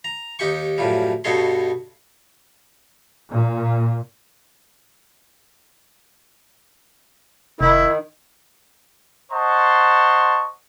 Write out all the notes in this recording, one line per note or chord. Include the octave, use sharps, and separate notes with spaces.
A#5
D#2 D#4 G4 G5 C#6
F#2 A2 F3 G3
G2 B2 D#4 A4 C#5 C6
A#2
F1 D#3 E4
C5 D#5 F#5 A5 C6 C#6